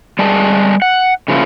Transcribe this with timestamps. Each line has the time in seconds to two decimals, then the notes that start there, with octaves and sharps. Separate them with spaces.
0.19 G3 G#3 G#4 A5
0.82 F#5
1.28 C#3 F3 A#3 E4